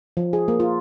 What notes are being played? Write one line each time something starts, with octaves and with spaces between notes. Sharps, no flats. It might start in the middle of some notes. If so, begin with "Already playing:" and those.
F3
G#4
A#3
F4